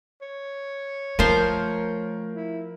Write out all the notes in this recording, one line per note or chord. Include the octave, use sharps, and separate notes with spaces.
C#5
F3 A3 A#4 C5
E4